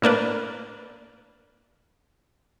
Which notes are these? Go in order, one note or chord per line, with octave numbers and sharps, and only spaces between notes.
A2 A#3 D4 B4